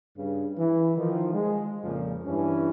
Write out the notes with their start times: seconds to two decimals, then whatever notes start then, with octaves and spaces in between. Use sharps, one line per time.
0.17 G2 C#3
0.58 E3
0.97 D#3 F3
1.33 G#3
1.84 F2 A#2 C#3 F3
2.25 G2 E3 C#4